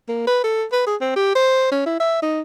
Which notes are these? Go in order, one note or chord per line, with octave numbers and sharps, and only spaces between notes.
A#3
B4
A4
B4
G#4
C4
G4
C5
C#4
E4
E5
D#4